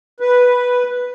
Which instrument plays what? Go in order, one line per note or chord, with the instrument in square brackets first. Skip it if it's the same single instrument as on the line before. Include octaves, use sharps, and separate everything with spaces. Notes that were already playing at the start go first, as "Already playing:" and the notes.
[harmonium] B4